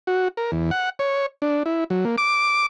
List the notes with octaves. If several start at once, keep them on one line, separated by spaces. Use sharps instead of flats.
F#4
A#4
E2
F#5
C#5
D4
E4
F#3
A#3
D6